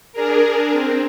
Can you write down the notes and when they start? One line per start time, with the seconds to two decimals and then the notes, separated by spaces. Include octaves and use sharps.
0.13 D4 G#4 A#4
0.71 C4